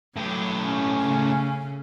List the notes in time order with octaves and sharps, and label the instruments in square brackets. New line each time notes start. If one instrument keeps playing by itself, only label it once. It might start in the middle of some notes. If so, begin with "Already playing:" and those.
[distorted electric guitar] A2 G4 [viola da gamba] F#3
[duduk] C#4
[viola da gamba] C#3 A3